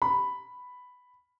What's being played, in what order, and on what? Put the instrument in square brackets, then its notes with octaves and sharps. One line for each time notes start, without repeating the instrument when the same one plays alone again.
[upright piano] B5